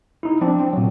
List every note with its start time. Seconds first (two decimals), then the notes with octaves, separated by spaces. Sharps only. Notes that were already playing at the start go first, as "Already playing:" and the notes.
0.23 D#4 E4
0.41 F3 C4 D4
0.60 C4
0.73 A#2 F#3